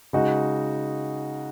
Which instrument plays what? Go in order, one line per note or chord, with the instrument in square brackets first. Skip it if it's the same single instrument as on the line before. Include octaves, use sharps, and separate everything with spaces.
[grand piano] C#3 G#3 D#4 F#4